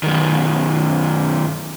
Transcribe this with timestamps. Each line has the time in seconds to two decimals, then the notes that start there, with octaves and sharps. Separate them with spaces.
0.03 F#2 D#3